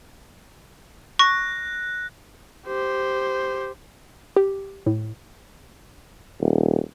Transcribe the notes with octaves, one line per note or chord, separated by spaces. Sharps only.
C#6 F#6 A#6
G4 C5
G4
A2
D#1